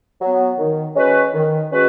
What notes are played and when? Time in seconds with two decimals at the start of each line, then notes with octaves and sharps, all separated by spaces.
0.21 F#3 B3
0.58 D#3
0.95 G#3 C#4 F#4 B4
1.33 D#3
1.71 G#3 C#4 F#4 B4